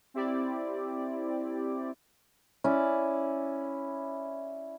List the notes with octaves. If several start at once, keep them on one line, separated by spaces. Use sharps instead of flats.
C4 E4 G4 D5
C#4 E4 D5